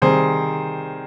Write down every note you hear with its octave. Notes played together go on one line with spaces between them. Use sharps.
C3 D#3 G3 G#4 C5